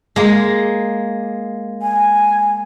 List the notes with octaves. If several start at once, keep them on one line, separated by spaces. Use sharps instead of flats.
G#3 A#3
G#5